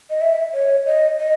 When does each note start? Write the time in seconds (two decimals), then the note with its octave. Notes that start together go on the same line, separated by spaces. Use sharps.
0.10 D#5
0.21 E5
0.53 C#5
0.86 D#5
1.18 D#5